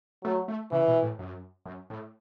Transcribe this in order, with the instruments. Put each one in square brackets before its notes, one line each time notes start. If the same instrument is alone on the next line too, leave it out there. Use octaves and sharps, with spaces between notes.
[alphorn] F#3 [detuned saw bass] A3
[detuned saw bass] A3
[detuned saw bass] C#3 [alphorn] E3
[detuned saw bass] B2
A2
F#2
F#2
A2